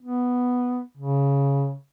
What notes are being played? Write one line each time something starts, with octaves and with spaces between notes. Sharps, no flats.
B3
C#3